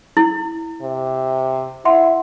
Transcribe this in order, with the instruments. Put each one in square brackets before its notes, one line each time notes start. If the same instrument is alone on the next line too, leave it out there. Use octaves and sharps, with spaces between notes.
[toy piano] E4
[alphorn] C3
[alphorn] E4 [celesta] E5 F#5 C6